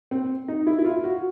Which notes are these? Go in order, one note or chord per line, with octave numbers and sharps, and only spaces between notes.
C4
D#4
E4
E4
F4
F#4